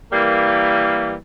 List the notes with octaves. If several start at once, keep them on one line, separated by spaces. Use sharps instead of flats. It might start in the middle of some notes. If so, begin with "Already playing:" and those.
E3 G3 A#3